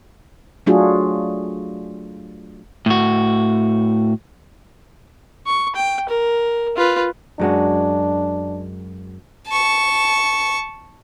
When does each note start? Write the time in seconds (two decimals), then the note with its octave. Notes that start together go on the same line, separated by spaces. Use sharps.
0.66 F#3 A3 D4 F4 F#4 G#4
2.86 A2 F#4
5.47 C#6
5.76 G5
6.10 A#4
6.77 F4 B4
7.40 F#2 G#3 D4 F#4
9.48 A5 C#6